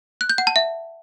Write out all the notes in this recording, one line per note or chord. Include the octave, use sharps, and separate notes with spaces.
F#6
G6
F#5
A5
E5